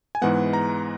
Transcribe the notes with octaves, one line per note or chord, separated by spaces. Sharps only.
G#5
G#2 E3 G#3 B3 F#5
A#5